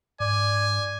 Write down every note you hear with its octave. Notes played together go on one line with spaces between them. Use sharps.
G#2 D5 G#5